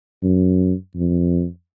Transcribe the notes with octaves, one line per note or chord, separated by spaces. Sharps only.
F#2
F2